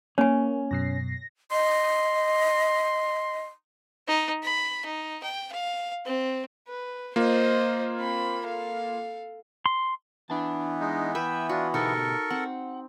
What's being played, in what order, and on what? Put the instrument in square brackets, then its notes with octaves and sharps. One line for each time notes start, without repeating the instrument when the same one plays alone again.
[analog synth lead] A#3 [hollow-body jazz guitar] C#4 [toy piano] C#5 G#5
[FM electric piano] F#2 B2 C7 [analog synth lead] A#6
[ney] D#5 [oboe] C6
[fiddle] D#4
B5
D#4
G5
F5
C4
[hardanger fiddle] B4
[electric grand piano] A#3 F4 [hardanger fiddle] C5 D#5
[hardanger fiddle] C4 B5
A4 F5
[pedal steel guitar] C6
[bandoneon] E3 B3 [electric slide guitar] D4 A5
[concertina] G#3 D#4
[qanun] B4 [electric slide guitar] E5 [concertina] G5 E6
[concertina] D4 F4 [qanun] F#4
[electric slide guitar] B2 F#4 G4 [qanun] D#4 [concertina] A4 A#4 C#6
[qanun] C4 [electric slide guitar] F#5